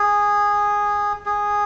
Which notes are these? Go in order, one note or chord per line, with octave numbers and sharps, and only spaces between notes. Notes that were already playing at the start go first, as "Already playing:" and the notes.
Already playing: G#4
G#4